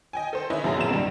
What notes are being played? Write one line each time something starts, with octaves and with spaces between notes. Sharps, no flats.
D#5 G5 G#5
A4 C5
C#4 E4 B4 C#5 D#5
A1 F#2 B2 E4 G#4 A#5
A#1 F2 E7
C#2 G2 G3